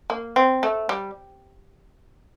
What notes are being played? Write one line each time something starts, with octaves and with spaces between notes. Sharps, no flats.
A#3
C4
A3
G3